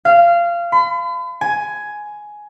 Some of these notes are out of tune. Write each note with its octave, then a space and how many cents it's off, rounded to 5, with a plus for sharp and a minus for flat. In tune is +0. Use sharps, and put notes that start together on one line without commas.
F5 -20
B5 +45
G#5 +10